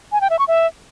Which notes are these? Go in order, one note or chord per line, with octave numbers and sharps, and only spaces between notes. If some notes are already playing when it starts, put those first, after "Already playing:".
G#5
G5
E5
C#6
E5